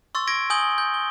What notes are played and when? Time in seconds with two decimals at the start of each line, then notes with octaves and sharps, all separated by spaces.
0.15 C6 C#6 E6 A6
0.28 C#6 G#6 A#6 D7
0.50 G#5 D#6 G6 F#7 G7
0.78 G6
0.94 G7